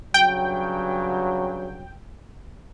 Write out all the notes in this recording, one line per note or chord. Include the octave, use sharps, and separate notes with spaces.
G2 C#3 F#3 G5